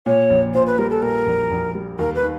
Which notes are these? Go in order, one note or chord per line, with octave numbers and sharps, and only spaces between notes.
A#2 C#5
A#1
A#2 C5
B4
G3 A#4
A4
A#2 A#4
A#1
A#1
G3
D#2 A#4
B4
D#3